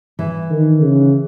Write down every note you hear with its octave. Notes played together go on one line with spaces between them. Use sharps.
E3
D#3
C#3